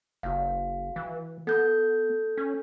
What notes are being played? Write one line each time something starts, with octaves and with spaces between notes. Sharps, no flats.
F#1 F#4 F5
E3
B3 A4 G6
C#4